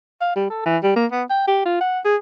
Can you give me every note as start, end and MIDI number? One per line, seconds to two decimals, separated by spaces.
0.21 0.35 77
0.36 0.45 55
0.50 0.64 69
0.66 0.78 52
0.83 0.94 55
0.96 1.06 58
1.12 1.23 59
1.30 1.47 79
1.48 1.61 67
1.65 1.78 65
1.81 2.00 78
2.05 2.16 68